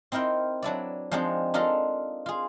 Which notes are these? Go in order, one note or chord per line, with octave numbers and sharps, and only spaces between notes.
C4 D#4 E4 A#4 G5
F#3 D4 E4 D5
F3 G#3 C4 D4 D#4
D4 D#4 F4 A4 A#4
F4 G#4